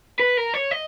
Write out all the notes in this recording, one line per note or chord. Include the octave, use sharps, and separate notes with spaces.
B4
A#4
C#5
D#5